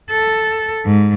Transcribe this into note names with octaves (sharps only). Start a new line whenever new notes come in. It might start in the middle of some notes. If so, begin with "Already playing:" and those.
A4
G#2